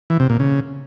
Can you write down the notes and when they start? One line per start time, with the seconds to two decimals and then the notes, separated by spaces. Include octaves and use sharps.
0.10 E3
0.20 C3
0.30 A#2
0.39 C#3